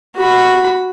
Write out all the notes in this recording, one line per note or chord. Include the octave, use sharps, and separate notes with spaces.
F#4 B5